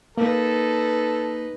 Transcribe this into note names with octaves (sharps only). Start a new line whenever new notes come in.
A#3 D#4 A4 B4